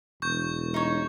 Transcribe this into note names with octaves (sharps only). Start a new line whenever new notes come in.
E1 C#6 G6
D#4 C#5